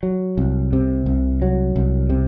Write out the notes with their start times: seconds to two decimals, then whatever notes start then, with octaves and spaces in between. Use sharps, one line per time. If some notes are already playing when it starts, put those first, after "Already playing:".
0.03 F#3
0.37 C2
0.73 C3
1.06 C2
1.42 F#3
1.76 C2
2.10 C3